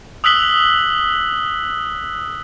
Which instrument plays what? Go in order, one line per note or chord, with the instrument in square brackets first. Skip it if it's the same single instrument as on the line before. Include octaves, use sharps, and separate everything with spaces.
[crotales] D#6 E6 F#6 B6 F#7 G7